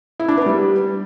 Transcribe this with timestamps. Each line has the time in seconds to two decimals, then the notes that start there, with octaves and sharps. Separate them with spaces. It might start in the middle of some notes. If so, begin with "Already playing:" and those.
0.20 E4
0.28 D4
0.37 B3
0.46 G3